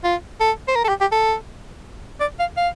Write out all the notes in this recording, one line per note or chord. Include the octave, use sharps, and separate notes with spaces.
F4
A4
C5
A#4
A4
G4
G4
A4
D5
F5
F5